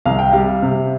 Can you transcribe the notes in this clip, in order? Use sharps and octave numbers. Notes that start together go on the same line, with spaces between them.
C2 F5
G5
G3 F5
C3